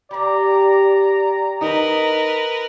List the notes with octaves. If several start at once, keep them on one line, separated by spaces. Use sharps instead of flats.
D4 G4 D5 A#5
D#4 A#4 B4